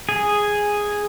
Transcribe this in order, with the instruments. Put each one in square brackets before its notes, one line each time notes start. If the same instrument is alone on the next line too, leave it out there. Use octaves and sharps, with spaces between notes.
[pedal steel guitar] G#4